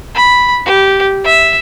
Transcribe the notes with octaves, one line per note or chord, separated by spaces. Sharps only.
B5
G4
E5